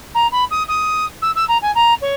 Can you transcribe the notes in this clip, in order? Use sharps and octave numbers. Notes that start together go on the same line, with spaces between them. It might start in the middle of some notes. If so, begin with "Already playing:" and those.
A#5
B5
D#6
D#6
E6
E6
A#5
G#5
A#5
C#5